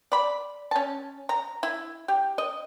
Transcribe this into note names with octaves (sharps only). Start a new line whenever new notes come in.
D5 B5
C#4 A5
A#5
E4
G4
D#5